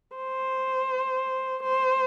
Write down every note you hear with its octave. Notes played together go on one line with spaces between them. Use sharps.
C5
C5